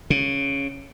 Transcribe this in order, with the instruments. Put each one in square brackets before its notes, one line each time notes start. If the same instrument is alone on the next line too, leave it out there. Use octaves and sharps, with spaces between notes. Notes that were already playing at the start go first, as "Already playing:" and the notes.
[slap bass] C#3